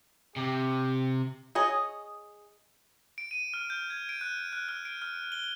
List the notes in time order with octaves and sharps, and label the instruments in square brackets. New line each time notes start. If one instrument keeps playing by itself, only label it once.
[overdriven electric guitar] C3 [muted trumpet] G4
[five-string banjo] G#4 C#5 D#5
[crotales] D7
D#7
F6
G6
G#6
D7
F#6
F#6
F6
D7
F6
G7